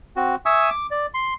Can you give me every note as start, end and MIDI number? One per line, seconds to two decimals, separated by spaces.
0.16 0.36 60
0.16 0.36 66
0.46 0.70 76
0.46 0.70 80
0.46 0.70 85
0.46 0.70 87
0.46 0.70 88
0.70 0.87 86
0.91 1.06 74
1.14 1.34 84